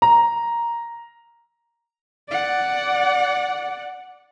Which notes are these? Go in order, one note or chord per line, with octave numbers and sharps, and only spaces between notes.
A#5
D5 F#5